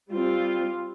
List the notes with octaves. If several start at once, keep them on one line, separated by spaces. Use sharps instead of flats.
G3 C4 F4